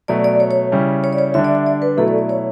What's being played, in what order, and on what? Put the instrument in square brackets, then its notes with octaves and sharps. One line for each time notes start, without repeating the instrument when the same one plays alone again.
[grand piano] B2 F#3 A3 [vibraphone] D5
[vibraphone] D5
C#5
C#5
[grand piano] C#3 G3 C#4 E4
[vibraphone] C#5
D5
C#5
[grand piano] D3 G3 D4 [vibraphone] E5
[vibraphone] D5
E5
D5
B4
[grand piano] B2 F#3 A3 E4 [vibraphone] A4
[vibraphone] D5
D5
C#5